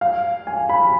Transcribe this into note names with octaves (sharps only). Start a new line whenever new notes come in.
F5
G#5
B5